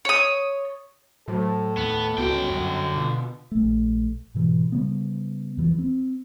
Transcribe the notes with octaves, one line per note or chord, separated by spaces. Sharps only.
C#5 D#6
A2 F#3 A4 C5
D#2 B3
C#2 D3 B3 F#4 G5
F#2
B2 F4
A#1 A3
G#2 B2 E3
C#3 G3 B3
E2 E3 F3
C4